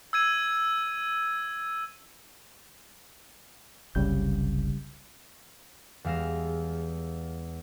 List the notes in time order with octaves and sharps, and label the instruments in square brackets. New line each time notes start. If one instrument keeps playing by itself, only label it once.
[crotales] E6 G#6 D#7
[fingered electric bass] F#1 C2 [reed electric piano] C#3 G3 G6
[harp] E2 G3 G#3 F5 A#6 E7